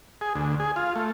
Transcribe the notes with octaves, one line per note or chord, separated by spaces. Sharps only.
G#4
D2
G#4
F4
A3